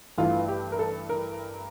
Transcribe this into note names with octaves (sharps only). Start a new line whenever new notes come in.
A1 G2 E3 A3 F4
G4
A#4
A4
A#4